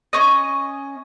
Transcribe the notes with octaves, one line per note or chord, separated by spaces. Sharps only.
C#4 D#5